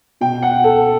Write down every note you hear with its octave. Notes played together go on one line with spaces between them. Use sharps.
B2 G5
F#5
A4